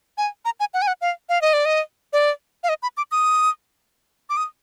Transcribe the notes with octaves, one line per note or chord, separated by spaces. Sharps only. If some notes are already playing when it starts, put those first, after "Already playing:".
G#5
A#5
G#5
F#5
G#5
F#5
F5
F5
D#5
D5
D#5
D5
F5
D#5
B5
D6
D#6
D6
D#6